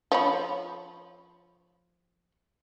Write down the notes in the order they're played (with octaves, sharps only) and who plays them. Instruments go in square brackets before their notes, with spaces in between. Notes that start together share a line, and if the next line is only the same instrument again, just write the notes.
[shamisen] F3 C#5 B5